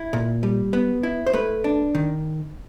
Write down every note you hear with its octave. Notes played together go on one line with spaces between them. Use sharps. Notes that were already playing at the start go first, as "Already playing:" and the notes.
Already playing: E4
A#2
G3
B3
E4
C5
A3 B4
D4
D#3